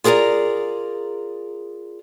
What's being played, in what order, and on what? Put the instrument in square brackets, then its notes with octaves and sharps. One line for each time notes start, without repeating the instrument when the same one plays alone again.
[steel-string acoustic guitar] F4 G#4 A#4 D5 A#5